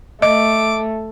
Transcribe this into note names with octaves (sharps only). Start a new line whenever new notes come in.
A3 D#5 D6